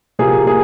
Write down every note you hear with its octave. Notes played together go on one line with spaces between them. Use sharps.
C3 F3 A#3 G#4
G#4